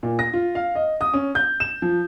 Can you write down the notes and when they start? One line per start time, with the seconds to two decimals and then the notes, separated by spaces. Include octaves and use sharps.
0.03 A#2
0.19 A#6
0.33 F4
0.55 F5
0.75 D#5
1.01 D#6
1.13 C#4
1.35 G6
1.60 E7
1.82 F3